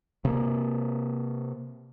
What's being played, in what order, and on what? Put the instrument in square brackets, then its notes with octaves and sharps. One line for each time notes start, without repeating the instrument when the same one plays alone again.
[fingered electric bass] C3 A#3